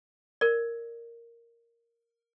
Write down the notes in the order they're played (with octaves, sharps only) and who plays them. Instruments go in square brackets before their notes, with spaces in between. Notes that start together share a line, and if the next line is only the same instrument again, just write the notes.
[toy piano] A#4 D5